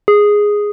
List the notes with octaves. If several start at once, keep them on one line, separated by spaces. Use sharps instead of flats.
G#4